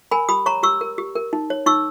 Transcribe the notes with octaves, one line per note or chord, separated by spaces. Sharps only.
A#4 G#5 B5
G4 B5 D#6
C#5 A#5 C#6
G4 C#6 E6
A#4
G4
A#4
D#4
C#5
D#4 C#6 E6